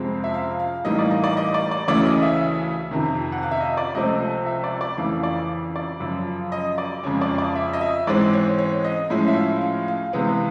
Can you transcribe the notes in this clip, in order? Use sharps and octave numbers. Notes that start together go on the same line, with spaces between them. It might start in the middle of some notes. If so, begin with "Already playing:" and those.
Already playing: F2 C3 F3 G#3 C4
E5
F5
F5
A2 E3 G3 A#3 D#4 D#5
D5
D#5
D5
D#5
D5
D5
D2 C#3 E3 A3 C#4 D5
D#5
E5
F2 C3 D#3
F#5
F5
E5
D#5
D5
C#2 C3 F3 A3 C4 D#5
E5
D5
D5
F2 C#3 E3 A3 F5
D5
D5
F#2 C#3 F3
D#5
D5
F2 C#3 F3 G#3 C#4 C#5
D5
D5
E5
D#5
E5
G#2 E3 G#3 C4 D5
C#5
C#5
D#5
A2 F3 G#3 C#4 E4
E5
F5
F5
F5
C3 E3 G#3 B3 F5